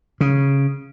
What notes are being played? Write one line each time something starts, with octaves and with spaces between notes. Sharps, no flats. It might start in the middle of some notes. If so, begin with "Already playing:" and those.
C#3